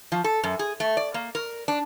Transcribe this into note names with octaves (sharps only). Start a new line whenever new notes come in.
F3
A4
F#2
G#4
A3
D5
A#3
A#4
D4